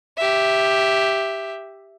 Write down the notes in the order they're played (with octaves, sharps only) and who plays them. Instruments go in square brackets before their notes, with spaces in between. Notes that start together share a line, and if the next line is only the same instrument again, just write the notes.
[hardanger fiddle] G4 E5